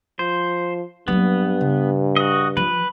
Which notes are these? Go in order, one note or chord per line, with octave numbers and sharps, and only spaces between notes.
F3 C5
G2 F#3 A#3 B3
C#3
F#4 D#5
F3 B4